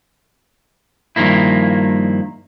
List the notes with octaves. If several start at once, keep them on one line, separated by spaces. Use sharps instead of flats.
G2 D#3 F3 A#3 E4